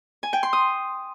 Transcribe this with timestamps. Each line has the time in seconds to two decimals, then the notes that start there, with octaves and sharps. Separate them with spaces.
0.23 G#5
0.33 G5
0.43 C6
0.53 D#6